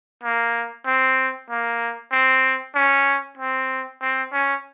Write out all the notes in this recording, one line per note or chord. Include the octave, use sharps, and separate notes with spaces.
A#3
C4
A#3
C4
C#4
C4
C4
C#4